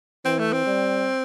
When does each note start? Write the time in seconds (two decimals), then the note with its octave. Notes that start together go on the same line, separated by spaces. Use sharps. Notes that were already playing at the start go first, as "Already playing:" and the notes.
0.25 E3 C4
0.39 A3
0.53 C4
0.66 G3